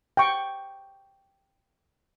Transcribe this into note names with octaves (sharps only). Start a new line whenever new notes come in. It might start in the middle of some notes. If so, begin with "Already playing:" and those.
G5 C#6